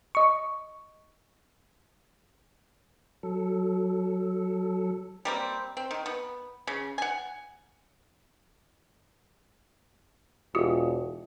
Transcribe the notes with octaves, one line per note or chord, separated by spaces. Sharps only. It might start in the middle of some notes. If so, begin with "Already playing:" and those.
D#5 C#6
F#3 A4
G3 A#3 C4
C4
D#3
B3
C#3
F#5 G#5
E1 F4 G4